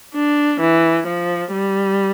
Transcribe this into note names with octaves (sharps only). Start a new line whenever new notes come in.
D4
E3
F3
G3